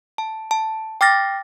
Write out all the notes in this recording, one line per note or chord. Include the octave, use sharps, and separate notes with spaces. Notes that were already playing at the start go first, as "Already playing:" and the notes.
A5
A5
G5 D6 F6 A6 A#6